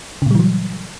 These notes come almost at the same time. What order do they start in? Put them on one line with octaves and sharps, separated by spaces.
C#3 A#2 G3 E3 F#3